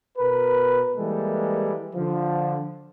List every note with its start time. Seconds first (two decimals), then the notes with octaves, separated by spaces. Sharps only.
0.18 B2 A#4 B4
0.96 E3 G3 G#3 A#3 A4
1.95 D3 F3